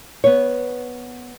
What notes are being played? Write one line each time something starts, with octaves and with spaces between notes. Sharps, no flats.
B3 C#5